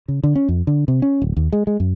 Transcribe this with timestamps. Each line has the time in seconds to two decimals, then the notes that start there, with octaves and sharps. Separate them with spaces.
0.08 C#3
0.24 D3
0.36 C#4
0.49 F2
0.67 D3
0.88 C3
1.02 C#4
1.22 D1
1.37 D#2
1.53 G#3
1.67 G#3
1.80 F#2